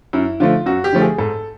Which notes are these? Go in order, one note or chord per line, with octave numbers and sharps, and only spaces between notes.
F#2 E4
D3 F3 A3 F4
F#2 F#4
G4
D3 F3 A3
G#4
G#2 A4